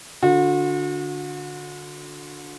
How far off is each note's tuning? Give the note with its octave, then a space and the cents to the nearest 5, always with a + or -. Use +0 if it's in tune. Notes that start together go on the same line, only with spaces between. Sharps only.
D3 +0 F#4 -40